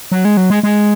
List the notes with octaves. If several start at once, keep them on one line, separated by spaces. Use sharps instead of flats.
F#3
G#3
F#3
G#3
G#3